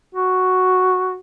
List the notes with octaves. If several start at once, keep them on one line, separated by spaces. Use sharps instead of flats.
F#4